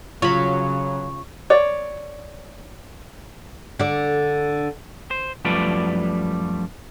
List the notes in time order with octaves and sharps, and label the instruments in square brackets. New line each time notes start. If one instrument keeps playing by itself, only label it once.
[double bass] C#3 [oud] F#3 [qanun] F4 B5 [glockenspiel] C#6
[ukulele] C#5 D5
[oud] D3 D5
[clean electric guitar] C5
F#2 F3 G3 A3 B4 D5